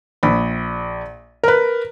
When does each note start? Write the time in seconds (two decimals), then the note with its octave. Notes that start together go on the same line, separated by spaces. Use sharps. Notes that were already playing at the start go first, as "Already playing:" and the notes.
0.23 A#1 B5
1.44 A#4 B4